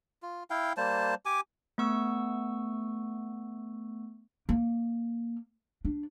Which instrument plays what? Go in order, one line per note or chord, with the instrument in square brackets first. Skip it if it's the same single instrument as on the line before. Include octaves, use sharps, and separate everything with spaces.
[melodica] F4
E4 F5 G5
G3 A#3 C5 A5
G4 G#5 D6
[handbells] A3 B3 C#6 E6
[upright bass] A#3
D4